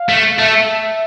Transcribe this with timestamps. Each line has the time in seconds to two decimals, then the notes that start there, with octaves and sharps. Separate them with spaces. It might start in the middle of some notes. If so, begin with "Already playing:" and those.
Already playing: F5
0.09 A3
0.39 A3 E5